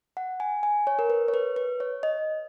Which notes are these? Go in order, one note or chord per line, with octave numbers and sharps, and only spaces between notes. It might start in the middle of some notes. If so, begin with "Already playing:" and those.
F#5
G#5
G#5
C#5
A#4
B4
C#5
B4
B4
C#5
D#5